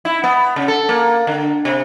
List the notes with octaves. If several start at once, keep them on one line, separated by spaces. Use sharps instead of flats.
E4
B3
C#3
A4
A#3
D3
C3